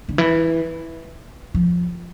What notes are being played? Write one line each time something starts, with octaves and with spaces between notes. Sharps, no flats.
D3
E3
F3